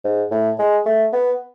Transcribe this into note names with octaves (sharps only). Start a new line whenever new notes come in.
G#2
A2
G#3
A3
B3